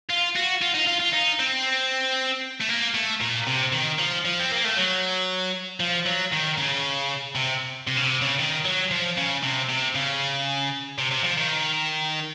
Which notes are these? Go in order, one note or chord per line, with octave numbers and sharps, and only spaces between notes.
F4
F#4
F4
D#4
F4
F4
D#4
C4
A3
A#3
A3
A#2
C3
D#3
F3
F3
C4
A#3
A3
F#3
F3
F#3
D#3
C#3
C3
C3
C#3
C3
C#3
D#3
F#3
F3
C#3
C3
C3
C#3
C3
C3
F3
D#3